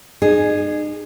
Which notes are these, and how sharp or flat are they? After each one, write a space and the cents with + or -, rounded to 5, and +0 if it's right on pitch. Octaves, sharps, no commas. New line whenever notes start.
D#4 -40 G#4 +5